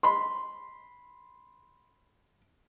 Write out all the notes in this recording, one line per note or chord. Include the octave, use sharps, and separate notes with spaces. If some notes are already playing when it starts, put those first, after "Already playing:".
B5 C6